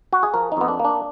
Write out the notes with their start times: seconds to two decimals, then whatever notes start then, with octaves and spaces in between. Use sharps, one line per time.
0.13 F#4
0.23 G#4
0.34 F3 A#4
0.52 D#4
0.57 F2 B3
0.68 D4
0.79 A#3
0.85 D4